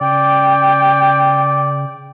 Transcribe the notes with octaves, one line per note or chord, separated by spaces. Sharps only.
C#3 D5 G5